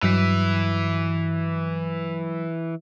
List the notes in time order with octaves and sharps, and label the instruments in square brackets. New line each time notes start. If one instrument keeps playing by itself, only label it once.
[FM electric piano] G2 F#3 B6 [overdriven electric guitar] E3